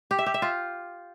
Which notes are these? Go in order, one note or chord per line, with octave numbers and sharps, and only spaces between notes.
G4
E5
G4
E5
F4